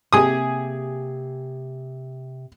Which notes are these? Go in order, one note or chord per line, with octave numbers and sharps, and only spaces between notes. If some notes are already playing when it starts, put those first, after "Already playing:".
C3 A#3 G4 G#4 D#6